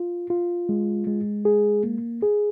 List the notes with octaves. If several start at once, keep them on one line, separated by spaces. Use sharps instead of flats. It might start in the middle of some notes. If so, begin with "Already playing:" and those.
Already playing: F4
F4
G#3
G#3
G#4
A#3
G#4